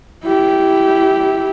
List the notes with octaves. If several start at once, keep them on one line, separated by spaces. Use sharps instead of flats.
E4 G4